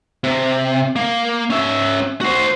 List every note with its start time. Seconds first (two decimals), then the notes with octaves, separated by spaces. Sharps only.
0.24 C3
0.96 A#3
1.50 C#4 E5
2.21 F#4 C5